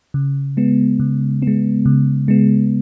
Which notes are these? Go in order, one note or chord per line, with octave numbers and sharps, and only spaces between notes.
C#3
G#3 B3
C#3
G#3 B3
C#3
G#3 B3